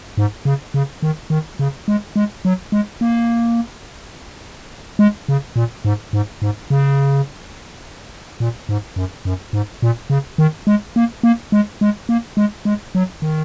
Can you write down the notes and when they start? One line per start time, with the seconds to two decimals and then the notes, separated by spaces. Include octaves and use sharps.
0.18 G#2
0.45 C#3
0.74 C#3
1.03 D#3
1.30 D#3
1.59 C#3
1.88 G#3
2.16 G#3
2.45 F#3
2.72 G#3
3.01 A#3
4.99 G#3
5.29 C#3
5.56 A#2
5.85 G#2
6.13 G#2
6.42 G#2
6.70 C#3
8.40 A#2
8.69 G#2
8.96 F#2
9.25 F#2
9.53 G#2
9.82 A#2
10.10 C#3
10.38 D#3
10.67 G#3
10.96 A#3
11.23 A#3
11.52 G#3
11.81 G#3
12.09 A#3
12.37 G#3
12.65 G#3
12.95 F#3
13.22 D#3